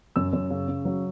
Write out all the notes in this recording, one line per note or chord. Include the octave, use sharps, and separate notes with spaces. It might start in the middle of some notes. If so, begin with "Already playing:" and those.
F#2 E6
F#2
C#3
C#3
F#3